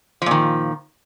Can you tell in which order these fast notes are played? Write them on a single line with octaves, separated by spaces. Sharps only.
F3 A#2 D#3